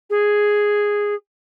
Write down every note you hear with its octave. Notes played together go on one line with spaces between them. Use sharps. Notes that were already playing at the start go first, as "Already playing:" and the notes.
G#4